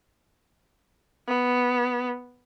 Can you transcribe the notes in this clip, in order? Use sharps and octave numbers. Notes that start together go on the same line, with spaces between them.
B3